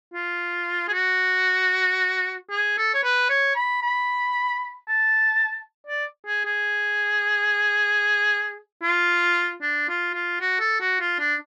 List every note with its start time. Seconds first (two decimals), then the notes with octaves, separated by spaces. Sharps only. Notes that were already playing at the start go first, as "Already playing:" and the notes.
0.14 F4
0.88 G#4
0.93 F#4
2.51 G#4
2.78 A4
2.94 C#5
3.03 B4
3.29 C#5
3.56 B5
3.83 B5
4.88 A5
5.87 D5
6.27 G#4
6.45 G#4
8.83 F4
9.62 D4
9.89 F4
10.14 F4
10.41 F#4
10.60 A4
10.81 F#4
11.00 F4
11.19 D4